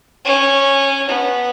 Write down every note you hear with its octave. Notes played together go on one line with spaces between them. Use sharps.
C#4
B3